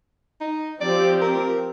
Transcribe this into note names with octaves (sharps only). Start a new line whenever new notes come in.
D#4
F3 C4 G4 D5
A#4